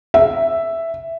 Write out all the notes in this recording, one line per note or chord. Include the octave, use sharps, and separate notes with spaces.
E5